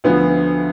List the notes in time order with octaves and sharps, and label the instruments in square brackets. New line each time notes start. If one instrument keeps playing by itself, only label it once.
[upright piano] D2 D3 F3 B3